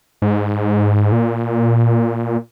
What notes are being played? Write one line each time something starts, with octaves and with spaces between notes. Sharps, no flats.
G#2
A#2